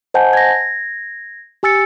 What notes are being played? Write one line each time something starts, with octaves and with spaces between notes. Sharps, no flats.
C5 D#5 F#5 G#5 A5 G6
G#6 A#6
G4 G#5 E6 A6 C#7